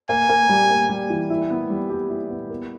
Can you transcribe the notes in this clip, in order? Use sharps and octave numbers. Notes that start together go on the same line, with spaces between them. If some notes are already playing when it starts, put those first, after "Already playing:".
A#3 G#5
A#3
G3
A#3
G3
E3
E4
B3
G3
G4
E4
B3
A#4